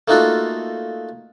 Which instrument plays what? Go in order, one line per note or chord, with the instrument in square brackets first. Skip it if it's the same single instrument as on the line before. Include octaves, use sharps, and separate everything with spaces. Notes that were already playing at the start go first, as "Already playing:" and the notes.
[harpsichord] A3 A#3 D#4 F4 F#4 A4